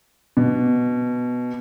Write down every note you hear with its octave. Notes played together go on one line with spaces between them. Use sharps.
B2